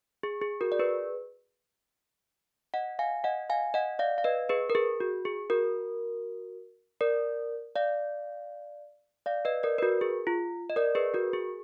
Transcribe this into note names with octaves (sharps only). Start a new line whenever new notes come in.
G#4
G#4
F#4 A#4
D5
G#4 B4
D#5 F#5
F5 G#5
D#5 F#5
F5 G#5
D#5 F#5
D5 F5
F5
B4 D#5
G#4 B4
A#4
G#4
F#4
G#4
F#4 A#4
A#4 D5
D5 F5
D5 F5
B4 D#5
A#4 D5
B4
F#4 A#4
G#4
F4
D#5
A#4 D5
G#4 B4
F#4 A#4
G#4